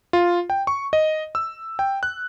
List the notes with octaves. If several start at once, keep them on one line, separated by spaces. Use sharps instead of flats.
F4
G5
C#6
D#5
E6
G5
F#6